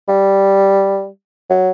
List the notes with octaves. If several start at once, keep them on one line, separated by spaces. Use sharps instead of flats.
G3
F#3